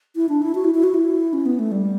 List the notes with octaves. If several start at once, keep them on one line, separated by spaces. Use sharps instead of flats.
E4
D4
E4
F#4
E4
E4
F#4
E4
C#4
B3
A3
G3